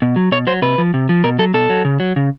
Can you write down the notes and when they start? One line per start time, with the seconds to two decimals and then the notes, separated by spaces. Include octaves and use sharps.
0.02 B2
0.16 F#3
0.32 B2 C#5
0.47 F#3 C5
0.62 C3 B4
0.78 F3
0.94 C3
1.09 F3
1.24 B2 A#4
1.39 F#3 A4
1.54 B2 A4
1.70 F#3
1.85 C#3
2.00 F#3
2.16 C#3